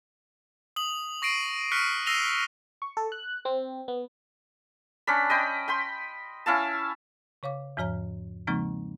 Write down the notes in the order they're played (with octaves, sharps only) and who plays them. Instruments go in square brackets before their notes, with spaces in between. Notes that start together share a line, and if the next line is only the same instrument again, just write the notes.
[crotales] D#6 F#7
C#6 A#6 C7 D7 D#7
C#6 F6 F#6 B6 C#7 D#7
E6 A#6 C7 D#7 F7 G7
[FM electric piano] C#6
A4
F#6
C4
B3
[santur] C#4 D4 B5
D#5 G5 B5
G5 B5 C6
C#4 E4 F5 A5
[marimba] C#3 C#5 F5 D6
E2 G#2 F3 C#5 A#5 F6
C#3 F3 G#3 A#3 C4 D#4